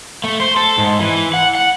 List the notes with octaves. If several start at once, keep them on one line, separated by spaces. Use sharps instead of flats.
A3
C5
A4
G#2
E3
F#5
F#5